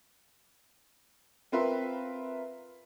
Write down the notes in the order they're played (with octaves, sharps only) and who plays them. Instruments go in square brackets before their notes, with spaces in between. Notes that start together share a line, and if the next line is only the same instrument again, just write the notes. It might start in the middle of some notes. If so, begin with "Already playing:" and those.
[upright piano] C4 F4 A#4 B4 E5 C6